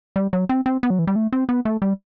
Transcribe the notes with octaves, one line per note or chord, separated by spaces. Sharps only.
G3
F#3
C4
C4
B3
F#3
E3
G3
A3
C4
B3
A3
G3